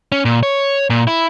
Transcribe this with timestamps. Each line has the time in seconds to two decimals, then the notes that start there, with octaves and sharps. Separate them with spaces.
0.12 C#4
0.25 A#2
0.43 C#5
0.90 A#2
1.07 E4